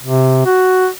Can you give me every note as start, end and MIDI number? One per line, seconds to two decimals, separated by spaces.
0.03 0.41 48
0.46 0.88 66